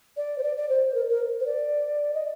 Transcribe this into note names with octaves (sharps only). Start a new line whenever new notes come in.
D5
C5
D5
D5
C5
A#4
A#4
C5
D5
D#5